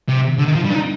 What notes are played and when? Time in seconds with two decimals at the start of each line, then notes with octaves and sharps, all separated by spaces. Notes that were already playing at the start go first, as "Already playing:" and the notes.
0.09 C3
0.38 D3
0.45 D#3
0.55 F3
0.64 G3
0.70 D4
0.74 D#4